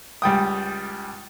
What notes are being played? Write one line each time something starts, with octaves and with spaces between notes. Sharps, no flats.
C#2 G3 G5 D#6